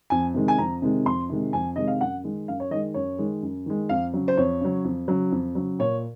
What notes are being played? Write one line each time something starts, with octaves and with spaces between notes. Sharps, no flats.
F2 G#5
C3 D#3 G#3
G#5
F2 A#5
C3 D#3 G#3
F2 C6
C3 D#3 G#3
F2 G#5
C3 D#3 G#3 D#5
F5
F#2 F#5
D#3 G#3
F#2 F5
C#5
D#3 G#3 D#5
F#2 C#5
D#3 G#3
F#2
D#3 G#3
F2 F5
C#3 F#3
C5
F2 C#5
C#3 F#3
F2
C#3 F#3
F2
C#3 F#3
A#2 C#5